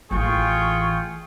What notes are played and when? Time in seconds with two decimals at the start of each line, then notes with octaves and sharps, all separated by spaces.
0.11 A1 E3 F4 G#4 G5 C#6